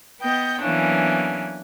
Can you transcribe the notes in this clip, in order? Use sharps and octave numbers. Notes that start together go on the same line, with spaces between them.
B3 D#5 G5 G6
E3 F#3 A#3 B3 C#4 D4